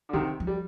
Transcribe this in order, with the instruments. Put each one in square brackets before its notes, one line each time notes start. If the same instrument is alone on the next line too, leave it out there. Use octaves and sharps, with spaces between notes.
[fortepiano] D3
[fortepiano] C3 D#3 [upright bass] F3
[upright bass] F3
[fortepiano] G3